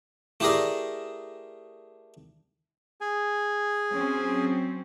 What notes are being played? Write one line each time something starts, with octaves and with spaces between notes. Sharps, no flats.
A3 E4 G4 G#4 A#4 D5
G#4 G#5
F#3 C4 C#4